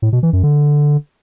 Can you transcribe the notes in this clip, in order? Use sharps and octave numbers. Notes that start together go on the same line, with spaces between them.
A2
B2
E3
F#2
D3